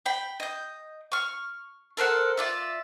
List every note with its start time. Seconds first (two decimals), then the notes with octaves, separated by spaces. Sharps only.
0.06 G5 B5
0.40 D#5 G6
1.12 C#6 F6
1.97 A4 A#4 C5 F#5
2.37 F4 D5 E5